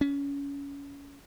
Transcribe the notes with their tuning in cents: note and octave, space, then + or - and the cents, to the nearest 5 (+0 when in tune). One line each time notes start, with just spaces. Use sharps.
C#4 +25